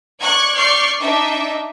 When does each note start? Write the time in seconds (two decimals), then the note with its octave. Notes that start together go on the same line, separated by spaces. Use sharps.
0.21 D5 C#6 F#6 G#6
0.55 D5 C#6 F6 G6 C7
1.00 D4 D#4 E5